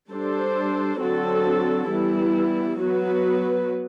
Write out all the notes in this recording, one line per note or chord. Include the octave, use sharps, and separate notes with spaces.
G3 D4 A4 C5
D3 F#3 C4 F#4 A4
E3 G3 B3 E4
F#3 B3 F#4 B4